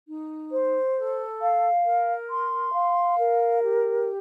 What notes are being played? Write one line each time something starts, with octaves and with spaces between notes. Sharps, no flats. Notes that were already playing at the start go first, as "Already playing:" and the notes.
D#4
C5
A4
F5
A#4
C6
F5
A#4
G4